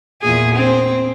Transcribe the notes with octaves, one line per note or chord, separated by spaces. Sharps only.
E2 A#2 G#4
C4